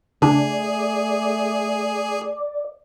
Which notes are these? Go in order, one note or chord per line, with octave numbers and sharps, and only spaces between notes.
C#3 A3 D4 G#4 D5